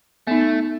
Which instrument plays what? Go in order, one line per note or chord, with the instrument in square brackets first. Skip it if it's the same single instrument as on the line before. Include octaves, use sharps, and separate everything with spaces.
[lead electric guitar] A3 [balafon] B3 D#4